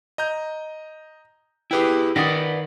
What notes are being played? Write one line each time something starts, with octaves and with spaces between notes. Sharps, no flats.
D#5 A#5 G6
E4 G4 G#4 B4 G5
D#3 B4 D5 F#5 D#6 A6 A#6